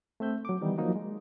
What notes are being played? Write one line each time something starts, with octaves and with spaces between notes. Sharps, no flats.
A3 C4 E5 G6
F#3 D6
D#3 E3 G3 B3 D#4
F3 F#3 A#3 D#4 F#4
G#3